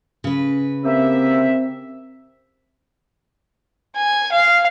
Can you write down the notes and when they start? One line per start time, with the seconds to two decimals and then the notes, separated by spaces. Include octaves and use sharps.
0.24 C#3 B4
0.85 A#3 C4 G4 E5
3.96 G#5
4.32 F5